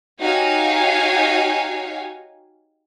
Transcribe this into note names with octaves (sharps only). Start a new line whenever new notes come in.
D#4 F#4 G4 C#5 F5 G#5